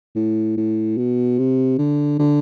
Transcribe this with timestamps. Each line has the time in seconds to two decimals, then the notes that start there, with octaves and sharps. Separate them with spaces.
0.15 A2
0.57 A2
0.98 B2
1.39 C3
1.78 D3
2.19 D3